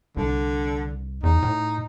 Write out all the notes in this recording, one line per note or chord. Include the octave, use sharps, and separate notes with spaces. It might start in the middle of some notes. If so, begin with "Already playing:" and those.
C2 D3
E2 D#4
A2